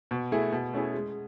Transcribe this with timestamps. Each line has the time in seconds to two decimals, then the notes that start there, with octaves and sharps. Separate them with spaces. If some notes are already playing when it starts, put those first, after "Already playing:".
0.11 B2
0.32 A3 E4 G#4
0.52 B2
0.73 A3 C#4 E4 G#4
0.94 G#3